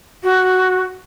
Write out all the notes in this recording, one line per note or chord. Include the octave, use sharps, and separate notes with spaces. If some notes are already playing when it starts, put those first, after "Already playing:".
F#4